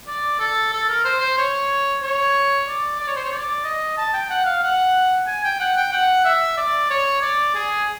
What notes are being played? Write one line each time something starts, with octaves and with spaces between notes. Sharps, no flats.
D5
A4
A4
A#4
C5
C5
C#5
C#5
D5
D5
C#5
C5
C#5
D5
D#5
A5
G5
F#5
F5
F#5
G#5
G5
F#5
G5
F#5
E5
D5
C#5
D5
G#4